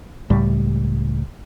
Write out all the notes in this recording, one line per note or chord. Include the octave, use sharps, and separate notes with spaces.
C#2 A2 G3